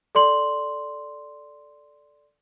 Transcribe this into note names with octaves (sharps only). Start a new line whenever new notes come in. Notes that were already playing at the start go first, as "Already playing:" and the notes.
A4 D5 C6 F#7